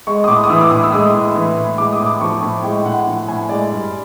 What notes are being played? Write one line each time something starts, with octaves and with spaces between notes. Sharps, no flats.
G#3 C#6
D#6
A2 D6
D#6
E3 E6
D6
A2 D#6
E6
G#3 D#6
A2
E3
A2
G#3 D6
D#6
A2
D6
F3 C#6
A2
G#3 G5
A2 F#5
F3
A2 G#5
G#3 D5
G2